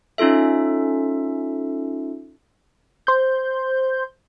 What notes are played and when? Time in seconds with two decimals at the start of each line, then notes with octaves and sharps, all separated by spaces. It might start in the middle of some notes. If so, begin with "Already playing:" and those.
0.18 C#4 D#4 F4 A4 E5
3.07 C5 G6